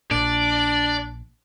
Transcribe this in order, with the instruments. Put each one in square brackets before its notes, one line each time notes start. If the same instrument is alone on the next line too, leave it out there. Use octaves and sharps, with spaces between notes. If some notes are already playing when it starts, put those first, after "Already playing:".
[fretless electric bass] A#1 A#2 [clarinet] D4 [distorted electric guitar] D5